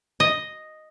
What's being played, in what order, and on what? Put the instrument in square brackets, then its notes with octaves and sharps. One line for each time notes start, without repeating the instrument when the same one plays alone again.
[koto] D#5